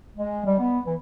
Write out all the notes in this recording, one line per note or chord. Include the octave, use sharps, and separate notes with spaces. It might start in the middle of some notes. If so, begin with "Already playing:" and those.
G#3
G3
B3
E3